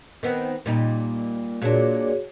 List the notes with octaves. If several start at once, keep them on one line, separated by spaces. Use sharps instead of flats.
D#3 B3 C4
A#2 G3 D#4
A#2 D4 F#4 G#4 C#5